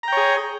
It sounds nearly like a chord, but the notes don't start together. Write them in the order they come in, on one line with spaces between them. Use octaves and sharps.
A#5 G5 C#5 G#4